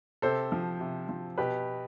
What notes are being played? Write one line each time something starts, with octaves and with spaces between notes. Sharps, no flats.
C3 A4 C5
F3
C3
F3
B2 G4 B4